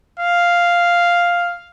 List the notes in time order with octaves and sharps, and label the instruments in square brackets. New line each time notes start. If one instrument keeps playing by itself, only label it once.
[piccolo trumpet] F5